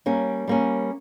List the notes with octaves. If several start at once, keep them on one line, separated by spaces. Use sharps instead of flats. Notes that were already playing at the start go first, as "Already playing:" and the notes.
G3 A#3 C#4
G3 A#3 C#4